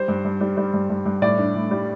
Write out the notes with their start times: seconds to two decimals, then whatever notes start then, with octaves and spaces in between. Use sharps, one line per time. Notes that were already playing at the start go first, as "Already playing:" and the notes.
Already playing: G3 C5
0.08 G2
0.25 G2
0.41 G3
0.57 G3
0.74 G2
0.90 G2
1.06 G2
1.22 A2 D5
1.38 D4
1.55 A2
1.71 G3